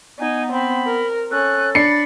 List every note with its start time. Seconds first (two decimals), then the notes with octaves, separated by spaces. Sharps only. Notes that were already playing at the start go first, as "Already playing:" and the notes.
0.19 B3 D#4 G#5
0.53 C4 B5
0.87 A#4
1.31 C#4 A4 F#6
1.75 D4 B5 A6 C7 C#7